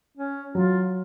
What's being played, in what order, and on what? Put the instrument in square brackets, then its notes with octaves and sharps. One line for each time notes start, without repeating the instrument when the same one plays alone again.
[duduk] C#4
[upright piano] F#3 [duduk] F4